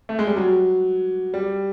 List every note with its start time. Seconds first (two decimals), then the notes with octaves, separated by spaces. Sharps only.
0.09 A3
0.19 G#3
0.27 G3
0.37 F#3
1.34 G3